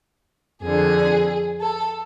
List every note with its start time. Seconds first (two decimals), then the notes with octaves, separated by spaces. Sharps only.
0.62 F2 D3 G#4
1.61 A4